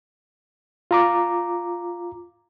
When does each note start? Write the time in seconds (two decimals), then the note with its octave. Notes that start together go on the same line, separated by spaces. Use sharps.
0.91 F4 A#5 D6